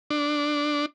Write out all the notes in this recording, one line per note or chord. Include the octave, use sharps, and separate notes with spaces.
D4